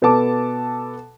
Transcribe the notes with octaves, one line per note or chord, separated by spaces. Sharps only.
B2 B3 A4 A5 D6